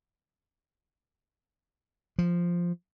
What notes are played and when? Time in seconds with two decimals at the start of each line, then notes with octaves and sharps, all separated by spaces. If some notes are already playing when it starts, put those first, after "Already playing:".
2.18 F3